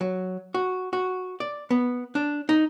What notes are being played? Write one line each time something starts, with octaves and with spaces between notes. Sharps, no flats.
F#3
F#4
F#4
D5
B3
D4
D#4